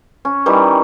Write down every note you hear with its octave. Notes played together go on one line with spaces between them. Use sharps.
C#4
D#3 E3 G3